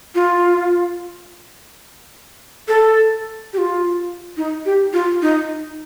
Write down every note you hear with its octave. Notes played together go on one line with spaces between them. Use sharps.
F4
A4
G4
F4
D#4
G4
F4
D#4